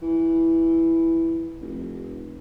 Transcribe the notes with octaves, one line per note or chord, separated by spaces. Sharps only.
E3
F1